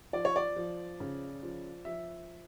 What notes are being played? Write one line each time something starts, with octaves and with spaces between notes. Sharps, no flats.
F3 D5
C#5
D5
F3
C#3
F3
F3 E5